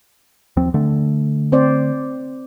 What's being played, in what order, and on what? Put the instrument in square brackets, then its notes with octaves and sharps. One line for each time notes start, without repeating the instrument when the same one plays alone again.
[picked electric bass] D#2 F3 C4
D3 A3
[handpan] C4 C5 D5